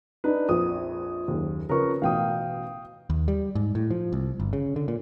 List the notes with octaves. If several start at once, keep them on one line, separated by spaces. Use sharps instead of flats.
D4 D#4 B4
A#1 F2 D#6
F#1 D#2
C#3 F3 A#4 B4 C#6
A1 B2 F5 G5 D#6
D#2
G3
G#2
A2
F3
C2
G1
C#3
D3
A#2